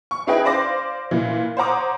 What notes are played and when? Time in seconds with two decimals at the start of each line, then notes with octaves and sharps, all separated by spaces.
0.11 C#6
0.27 C#4 E4 G#4 B4 D#5 G5
0.45 C5 D5 F5 C6 D6 A#6
1.11 A#2 E3
1.57 C5 C#5 F#5 A#5 D6 D#6